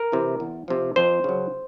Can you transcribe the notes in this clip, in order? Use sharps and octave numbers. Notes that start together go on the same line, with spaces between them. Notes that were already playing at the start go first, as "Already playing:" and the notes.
Already playing: A#4
C3 E3
E2
C3 F3
F2 C5
C#3 F#3